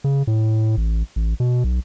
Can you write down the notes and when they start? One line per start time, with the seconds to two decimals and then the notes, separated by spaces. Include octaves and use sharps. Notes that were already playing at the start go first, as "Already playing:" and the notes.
0.04 C#3
0.27 A2
0.77 A1
1.16 A1
1.40 B2
1.64 B1